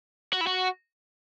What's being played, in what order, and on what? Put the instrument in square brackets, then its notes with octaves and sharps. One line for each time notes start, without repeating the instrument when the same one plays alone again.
[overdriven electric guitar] F#4
E4
F#4